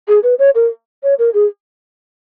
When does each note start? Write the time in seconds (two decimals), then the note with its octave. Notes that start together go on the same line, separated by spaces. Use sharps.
0.08 G#4
0.23 B4
0.39 C#5
0.55 A#4
1.03 C#5
1.19 A#4
1.34 G#4